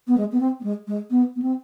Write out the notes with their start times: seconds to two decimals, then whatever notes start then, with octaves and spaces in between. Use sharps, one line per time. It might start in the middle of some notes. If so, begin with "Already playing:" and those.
0.08 B3
0.17 G#3
0.32 B3
0.40 C4
0.60 B3
0.64 G#3
0.87 G#3
1.11 B3
1.36 B3
1.42 C4